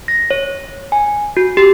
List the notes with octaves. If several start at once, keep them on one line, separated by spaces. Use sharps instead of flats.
A#6
C#5
G#5
F#4
G4